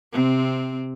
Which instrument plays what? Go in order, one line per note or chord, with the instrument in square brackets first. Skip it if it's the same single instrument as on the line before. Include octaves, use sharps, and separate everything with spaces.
[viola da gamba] C3 C4